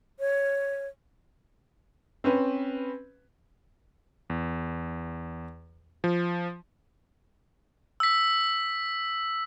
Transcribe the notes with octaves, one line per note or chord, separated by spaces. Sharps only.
C#5
C4 C#4 B4
E2
F3
E6 B6